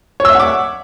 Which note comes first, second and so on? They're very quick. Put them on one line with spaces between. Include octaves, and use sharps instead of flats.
C#5 E6 E5 F#5 D6